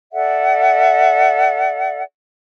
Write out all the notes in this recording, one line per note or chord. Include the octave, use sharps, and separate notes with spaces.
A4 D5 E5 F#5